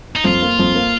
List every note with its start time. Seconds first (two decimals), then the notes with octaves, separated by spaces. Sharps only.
0.16 D#4
0.24 F2 F4
0.42 A#3
0.59 F2
0.75 A#3